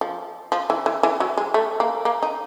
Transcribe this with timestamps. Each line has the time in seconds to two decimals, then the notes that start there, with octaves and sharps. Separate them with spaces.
0.01 F3
0.52 F3
0.70 E3
0.86 E3
1.03 E3
1.20 F#3
1.37 G#3
1.54 A3
1.80 A#3
2.05 A#3
2.23 D#4